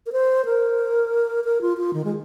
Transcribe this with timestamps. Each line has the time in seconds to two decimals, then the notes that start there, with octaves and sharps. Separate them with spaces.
0.06 A#4
0.12 C5
0.45 A#4
1.44 A#4
1.61 F4
1.77 F4
1.94 D#3
2.05 G#3